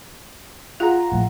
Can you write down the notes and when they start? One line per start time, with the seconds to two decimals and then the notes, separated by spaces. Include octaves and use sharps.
0.80 F4 G#4 F#5 A#5
1.12 A#1 A2